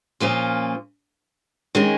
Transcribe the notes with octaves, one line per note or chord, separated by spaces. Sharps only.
A#2 F3 A#3 C#4 F4
D#3 G#3 C#4